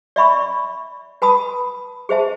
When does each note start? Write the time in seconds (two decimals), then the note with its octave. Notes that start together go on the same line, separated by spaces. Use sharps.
0.16 D5 E5 B5 C#6
1.22 B4 A5 B5 D#6
2.09 G#4 C5 E5 A5